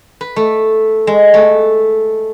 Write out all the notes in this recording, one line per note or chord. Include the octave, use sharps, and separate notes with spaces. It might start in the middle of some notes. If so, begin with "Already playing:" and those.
B4
A3
G#3
A3